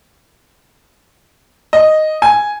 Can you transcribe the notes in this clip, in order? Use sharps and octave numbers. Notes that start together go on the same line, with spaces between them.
D#5
G#5